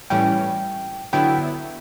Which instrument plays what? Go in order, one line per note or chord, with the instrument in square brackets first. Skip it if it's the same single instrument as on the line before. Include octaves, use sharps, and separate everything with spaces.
[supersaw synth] A2 E3 G3 C#4 [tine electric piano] G5
[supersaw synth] D3 F#3 B3 E4 [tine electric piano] G5